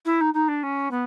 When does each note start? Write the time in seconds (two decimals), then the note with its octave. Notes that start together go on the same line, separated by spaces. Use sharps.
0.05 E4
0.21 D#4
0.34 D#4
0.48 D4
0.63 C#4
0.91 B3